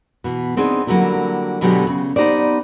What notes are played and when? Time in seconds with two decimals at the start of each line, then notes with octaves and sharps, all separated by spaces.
0.24 B2 E3
0.57 B3 C4 D4 D#4 G#4
0.87 D3 F#3 G3 A#3 E4
1.61 B2 D3 F#3 G#3 B3 G4
1.87 C#3
2.16 B3 D#4 G4 C5 D5